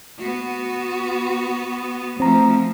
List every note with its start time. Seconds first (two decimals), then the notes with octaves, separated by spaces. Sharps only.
0.19 B3 F#4
2.20 F3 A3 C4 A#5